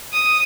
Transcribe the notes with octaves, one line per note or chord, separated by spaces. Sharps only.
D#6